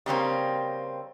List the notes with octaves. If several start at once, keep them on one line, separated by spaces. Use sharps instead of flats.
C#3 G3 A#3 C4